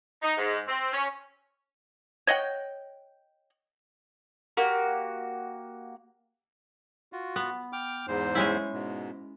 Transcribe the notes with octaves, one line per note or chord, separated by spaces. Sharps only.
D#4
G#2
C4
C#4
C#5 D#5 F#5 G5
A#3 F#4 G4
F4 F#4
B3
G5 D6 F6
E2 G#2 C5
G#3 C#4 E4
G#2 B2